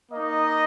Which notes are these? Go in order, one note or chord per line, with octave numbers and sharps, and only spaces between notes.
A#3 D#4 D#5